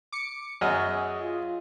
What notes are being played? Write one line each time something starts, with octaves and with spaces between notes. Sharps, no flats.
D6 C#7
F#2 F#4 G#4 D#5
F4